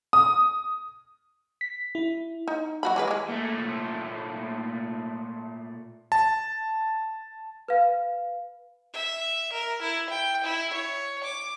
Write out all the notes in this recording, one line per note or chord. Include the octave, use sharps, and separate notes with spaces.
D#6
B6
E4
D#4
F#3 F#4 B5
E3 G#3 B4
E3 G#3
A#2 A3
A5
B4 F5
E5
A#4
E4
G5
E4
C#5
D6